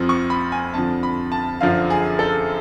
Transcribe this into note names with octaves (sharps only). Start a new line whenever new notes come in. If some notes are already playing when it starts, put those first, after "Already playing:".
Already playing: F2 F3
C#6
B5
G#5
F2 D3 F3 A5
B5
A5
F#2 D3 F3 F5
G#4
A4